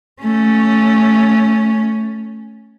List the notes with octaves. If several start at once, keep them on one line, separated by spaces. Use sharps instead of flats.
A3 C#4